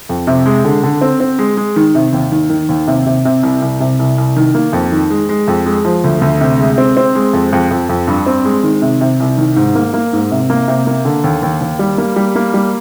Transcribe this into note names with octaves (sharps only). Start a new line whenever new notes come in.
F2
C3
G#3
D3
D3
C4
C4
G#3
G#3
D#3
C3
D#2
D#3
D#3
D#2
C3
C3
C3
C2
C2
C3
C2
C2
D#3
A#3
F2
D#3
G#3
G#3
F2
G#3
F3
D2
D2
C3
G#3
C4
C4
G#3
F2
F2
F2
F2
G2
C4
G#3
D#3
C3
C3
C2
D#3
G#2
A#3
A#3
G#2
C3
A#3
C3
A#3
D3
D#2
D#2
D#2
G3
A#3
G3
A#3
G3